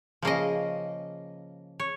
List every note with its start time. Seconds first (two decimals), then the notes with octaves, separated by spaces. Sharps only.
0.22 C#3 F3 A#3 D#5
1.80 C#5